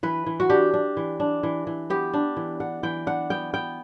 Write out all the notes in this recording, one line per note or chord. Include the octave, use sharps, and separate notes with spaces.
E3 B4
E3
F#4
D4 G4
D4
E3
D4
E3
E3
B3 G4
D4
E3
D4 F#5
E3 G5
D4 F#5
B3 G5
B3 G5